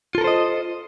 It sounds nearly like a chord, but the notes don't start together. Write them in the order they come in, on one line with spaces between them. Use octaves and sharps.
F4 A4 A#4 C5 D#5